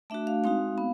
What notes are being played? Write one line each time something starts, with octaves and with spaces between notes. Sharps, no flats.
A3 D4 F#4 E5
F5
G#3 C4 D#4 F#4 F5
B3